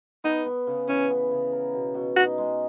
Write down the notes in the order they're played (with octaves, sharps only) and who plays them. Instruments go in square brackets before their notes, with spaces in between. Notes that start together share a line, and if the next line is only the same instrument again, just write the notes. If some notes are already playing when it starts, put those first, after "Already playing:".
[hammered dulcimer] B3 [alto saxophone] D#4
[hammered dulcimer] B3
C#3
[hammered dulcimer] E3 [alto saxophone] C#4
[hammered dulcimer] B3
C#3
A#4
B2
B2
[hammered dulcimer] D#4 [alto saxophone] F#4
[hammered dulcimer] G#3